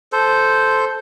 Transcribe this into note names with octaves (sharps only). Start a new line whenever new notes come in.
A4 C5